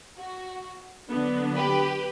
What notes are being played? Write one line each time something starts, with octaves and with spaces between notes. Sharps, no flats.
F#4
D3 F#3 B3 D4
G4 B4